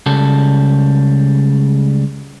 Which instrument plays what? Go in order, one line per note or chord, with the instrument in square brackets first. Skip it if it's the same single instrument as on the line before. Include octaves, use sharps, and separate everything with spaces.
[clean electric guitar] C#2 C#3 G3 A4